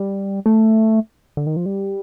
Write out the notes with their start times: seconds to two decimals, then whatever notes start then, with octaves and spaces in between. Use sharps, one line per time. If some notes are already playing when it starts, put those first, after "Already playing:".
Already playing: G3
0.46 A3
1.37 D3
1.47 D#3
1.56 F3
1.66 G3